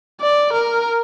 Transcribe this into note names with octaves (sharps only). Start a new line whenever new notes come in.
D5
A#4